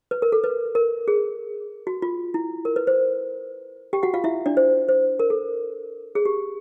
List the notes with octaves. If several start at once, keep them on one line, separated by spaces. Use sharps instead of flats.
B4
A#4
A4
B4
A#4
G#4
F#4
F4
E4
A#4
B4
C5
G4 G5
F#4 F#5
F4 F5
E4 E5
D4 D5
C5
C5
A#4
A4
G#4
G4